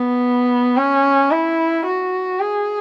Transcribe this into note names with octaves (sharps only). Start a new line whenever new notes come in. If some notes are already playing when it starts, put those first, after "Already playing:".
Already playing: B3
C#4
E4
F#4
G#4